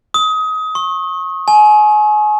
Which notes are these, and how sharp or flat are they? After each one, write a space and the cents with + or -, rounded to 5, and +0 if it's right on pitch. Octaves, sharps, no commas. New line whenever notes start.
D#6 +25
C#6 -30
G#5 +30